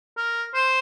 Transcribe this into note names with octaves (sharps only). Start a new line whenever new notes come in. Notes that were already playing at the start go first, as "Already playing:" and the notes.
A#4
C5